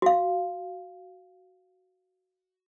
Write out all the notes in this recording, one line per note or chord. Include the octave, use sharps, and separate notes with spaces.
F#4 F5